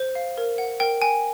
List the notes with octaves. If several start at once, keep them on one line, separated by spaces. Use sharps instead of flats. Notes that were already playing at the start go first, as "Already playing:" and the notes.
Already playing: C5
F5
A#4
F#5
A#4 G5
G5 G#5